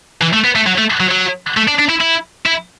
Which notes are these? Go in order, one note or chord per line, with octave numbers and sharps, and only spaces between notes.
E3
A3
B3
A3
F#3
A3
F#3
F#3
A3
D4
D4
E4
E4
E4